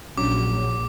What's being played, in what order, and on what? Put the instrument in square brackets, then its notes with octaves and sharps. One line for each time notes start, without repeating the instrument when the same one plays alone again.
[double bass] A#1 [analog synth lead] F#3 [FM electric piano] C#4 D4 [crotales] D6